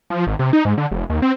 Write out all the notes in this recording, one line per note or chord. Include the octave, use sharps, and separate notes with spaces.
F3
G#1
C3
D#4
G#2
D3
F1
D#2
C4